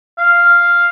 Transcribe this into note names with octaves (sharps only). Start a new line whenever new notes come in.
F5